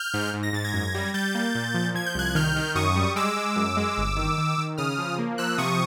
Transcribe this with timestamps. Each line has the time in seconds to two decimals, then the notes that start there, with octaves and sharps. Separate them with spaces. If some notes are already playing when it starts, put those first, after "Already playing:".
Already playing: F6 G6
0.14 G#2
0.34 G#2
0.43 A#6
0.53 G#2 A6
0.64 G#6 A#6
0.73 F#2
0.95 G3
1.14 G3 G6 A6
1.35 A#3
1.55 A#2
1.74 F3
1.95 F3 G#6
2.06 G6
2.15 C2 F#6 G#6
2.35 D#3 F6 G6
2.56 D#3
2.75 F#2 C#6 D#6
2.96 G3
3.16 G#3 D6 E6
3.37 G#3
3.56 F#2
3.77 G#3
3.97 G1
4.17 D#3
4.38 D#3
4.58 D#3
4.78 C#3 D#6 F6
4.98 F3
5.19 A#3
5.38 F3 E6 F#6
5.58 C3 C#6 D#6